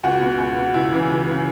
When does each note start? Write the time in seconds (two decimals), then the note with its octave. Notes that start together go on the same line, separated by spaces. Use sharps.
0.03 C#2 F#4
0.21 B2
0.38 C#2
0.57 B2
0.74 C#2 E4
0.92 C#3 E3
1.10 C#2
1.26 C#3 E3